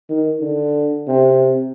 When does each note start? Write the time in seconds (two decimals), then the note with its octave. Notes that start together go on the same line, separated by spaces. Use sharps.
0.09 D#3
0.42 D3
1.07 C3